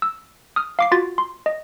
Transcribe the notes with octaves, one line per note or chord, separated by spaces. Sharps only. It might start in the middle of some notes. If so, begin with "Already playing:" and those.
E6
D#6 F6
F5 D6 C7
F4 F#4 A6
C6
D#5